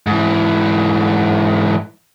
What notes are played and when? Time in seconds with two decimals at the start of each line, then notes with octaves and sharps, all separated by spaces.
0.07 G#2 E3